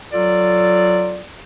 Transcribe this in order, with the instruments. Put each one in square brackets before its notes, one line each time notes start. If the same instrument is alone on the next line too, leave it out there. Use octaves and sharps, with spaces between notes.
[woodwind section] F#3 F4 A4 D5